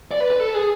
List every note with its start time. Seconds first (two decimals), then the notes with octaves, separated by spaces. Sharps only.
0.11 D5
0.20 B4
0.30 B4
0.40 A4
0.54 G#4